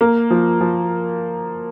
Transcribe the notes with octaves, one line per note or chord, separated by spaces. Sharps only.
A#3
F3
F3